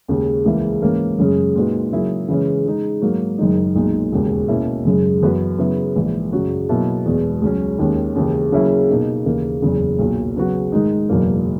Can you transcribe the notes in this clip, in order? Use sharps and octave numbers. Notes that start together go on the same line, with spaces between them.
D#2 C#3 G#3
C#2 C#3 E3 A#3 E4
G#2 E3 A#3 C#4
F#2 C#3 G#3 C#4 G#4
A#2 G#3 D#4 F#4 B4
C#3 F#3 A#3 E4 G#4
C#3 E3 G#3 C#4
C#3 G#3 D#4
G#2 F#3 A#3
F#1 F#2 D#3 G#3 D#4
B1 A#2 G#3 D#4
E1 D#2 C#3
B2 A#3 C#4 E4
F#1 F#2 C#3 G#3
F#2 E3 B3 F#4 B4
C#3 F#3 B3 E4
A#1 G#2 E3
F#2 C#3 F#3 C#4 F#4
B2 F#3 A#3 E4
E1 E2 B2 G#3 B3
C#2 C#3 F#3 C#4
D#2 D#3 G#3 C#4
D#2 C#3 E3
C#3 F#3 A#3 C#4 E4
B2 A#3 D#4
D#2 C#3 E3 A#3
F#1 E2 C#3
B1 A#2 F#3
C#3 F#3 B3 F#4
G#2 D#3 G#3 D#4
F#1 E2 B2 F#3 A#3